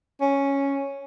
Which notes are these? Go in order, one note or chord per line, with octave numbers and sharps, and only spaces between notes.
C#4